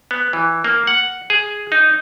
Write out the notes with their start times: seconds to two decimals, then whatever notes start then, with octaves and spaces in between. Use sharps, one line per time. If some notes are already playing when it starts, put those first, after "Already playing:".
0.11 B3
0.33 E3
0.64 A#3
0.87 F#5
1.30 G#4
1.72 D#4